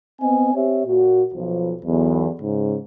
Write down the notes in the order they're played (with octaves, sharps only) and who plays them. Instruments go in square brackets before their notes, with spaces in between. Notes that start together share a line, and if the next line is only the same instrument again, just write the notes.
[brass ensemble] B3 C4 D#5 G#5
C4 G4 C#5 E5
A#2 F#4
B1 F3
B1 E2
G#2 C#3